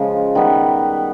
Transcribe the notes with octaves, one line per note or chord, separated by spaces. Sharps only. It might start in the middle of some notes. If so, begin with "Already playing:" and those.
Already playing: C#3 F3 G#3
D#3 G3 B3